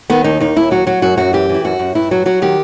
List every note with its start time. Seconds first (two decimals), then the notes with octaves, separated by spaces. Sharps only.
0.10 D#3 B3
0.24 D#2 D#4
0.40 D#2 D#4
0.56 D#2 E4
0.71 F#3 F#4
0.87 F#3 F#4
1.02 F#2 F#4
1.17 F#2 F#4
1.33 E3 G4
1.49 E3 E4
1.64 F#2 F#4
1.79 F#2
1.95 G2 E4
2.11 F#3 F#4
2.26 F#3 F#4
2.42 D#3 G4